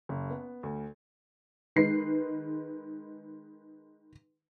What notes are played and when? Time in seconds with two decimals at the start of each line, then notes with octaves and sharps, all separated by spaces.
0.09 F#1
0.30 B3
0.63 D2
1.76 D#3 G#3 B4 C7